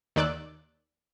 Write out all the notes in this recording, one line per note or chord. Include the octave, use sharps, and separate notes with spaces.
D#2 D#3 D5 D6 E6 F#6